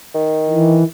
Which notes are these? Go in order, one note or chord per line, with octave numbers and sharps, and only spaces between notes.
D#3
E3